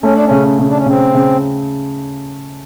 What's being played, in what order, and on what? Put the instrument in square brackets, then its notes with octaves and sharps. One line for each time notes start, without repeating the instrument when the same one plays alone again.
[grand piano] A3 [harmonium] C#4
[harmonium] D4
C#4
[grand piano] C#3
C#3
[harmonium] D4
C#4
[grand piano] C#3 [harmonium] C4
[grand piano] C#3